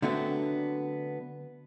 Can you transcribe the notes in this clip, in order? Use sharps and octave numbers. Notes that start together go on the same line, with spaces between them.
D3 F#3 A3 B3 C4 D4